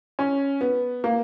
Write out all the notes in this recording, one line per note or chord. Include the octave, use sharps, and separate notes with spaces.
C#4
B3
A#3